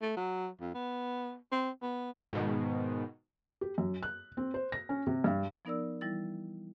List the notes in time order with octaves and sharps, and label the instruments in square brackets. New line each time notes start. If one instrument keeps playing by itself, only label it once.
[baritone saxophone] A3
F#3
F2
B3
C4
B3
[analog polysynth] G#2 B2 D#3
[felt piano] G4
F#2
F#6
C4
C5
A#6
C#4
C3
G2
[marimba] F3 B3 D#4 A#4 D5 E6
E3 G3 E4 A6